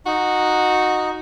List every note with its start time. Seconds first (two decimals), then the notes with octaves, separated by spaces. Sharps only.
0.06 D#4 F#4